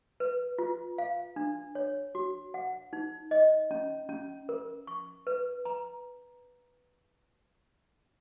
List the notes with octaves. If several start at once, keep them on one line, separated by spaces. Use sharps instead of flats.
B4
F4
F5
D4
C#5
F#4
F#5
D#4
D#5
C#4
C#4
A#4
C#6
B4
A#5